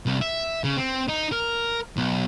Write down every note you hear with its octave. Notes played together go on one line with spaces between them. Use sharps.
C2
E5
C#3
C4
D#4
A#4
B1